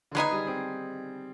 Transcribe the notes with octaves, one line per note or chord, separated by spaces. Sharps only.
D3
D#3 G#3 B3 D#4 G#4
G3
C4